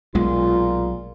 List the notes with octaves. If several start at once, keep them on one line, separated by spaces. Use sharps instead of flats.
B1 A#2 G#3 F4